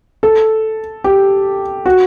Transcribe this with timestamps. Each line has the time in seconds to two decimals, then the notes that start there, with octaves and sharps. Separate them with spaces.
0.23 A4
1.04 G4
1.86 F#4